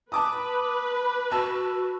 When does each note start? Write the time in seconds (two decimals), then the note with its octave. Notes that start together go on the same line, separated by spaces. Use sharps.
0.12 B4 A5 D6 D#6
1.32 F#4 A5 E6